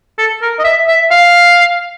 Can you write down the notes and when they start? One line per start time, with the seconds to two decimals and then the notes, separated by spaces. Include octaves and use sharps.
0.18 A4
0.42 A#4
0.59 D#5
0.64 E5
0.88 E5
1.11 F5